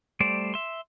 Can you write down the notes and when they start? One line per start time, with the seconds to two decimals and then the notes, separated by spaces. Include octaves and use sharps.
0.20 G3 A3 C5 D5
0.54 E5 C6